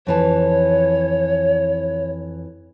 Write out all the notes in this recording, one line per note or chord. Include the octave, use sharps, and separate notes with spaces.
F2 E3 C#5 A5